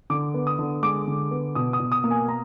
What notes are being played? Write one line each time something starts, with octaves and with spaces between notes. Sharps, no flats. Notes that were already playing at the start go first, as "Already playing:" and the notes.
D3 D6
B3
D#6
D3
G#3 D6
D3
B3
B2 D#6
D#6
B2
D#6
A#3
G#5
A#3 A#5